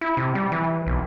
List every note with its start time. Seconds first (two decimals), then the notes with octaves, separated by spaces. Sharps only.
0.01 E4
0.17 C3
0.35 G3
0.52 E3
0.87 B1